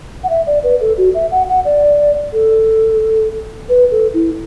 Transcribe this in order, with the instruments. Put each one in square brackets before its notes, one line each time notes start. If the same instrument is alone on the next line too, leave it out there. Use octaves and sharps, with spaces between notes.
[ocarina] F#5
E5
D5
B4
A4
F#4
E5
F#5
F#5
D5
A4
B4
A4
E4